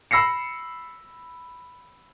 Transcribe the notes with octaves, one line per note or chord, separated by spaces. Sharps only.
B5 E6 A#6 C7 C#7